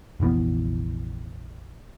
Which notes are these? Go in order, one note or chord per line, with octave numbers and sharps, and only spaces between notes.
F1 A#1 E3 B3